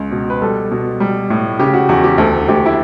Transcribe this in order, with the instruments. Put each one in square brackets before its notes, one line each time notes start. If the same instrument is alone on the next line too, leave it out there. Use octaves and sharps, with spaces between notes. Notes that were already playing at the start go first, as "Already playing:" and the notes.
Already playing: [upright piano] C#2
B2
B4
G3 A4
B2
G3
A2
C#3 G4
F#4
E2 F#4
G4
D2 A4
D2 G4
E4